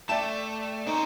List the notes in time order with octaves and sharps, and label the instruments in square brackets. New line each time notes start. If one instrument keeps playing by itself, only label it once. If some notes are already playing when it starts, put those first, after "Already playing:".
[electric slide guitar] A3 [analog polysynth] D5 E7 [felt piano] E5 G5 A5
[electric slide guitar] C4 C#4 C5 [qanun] D#4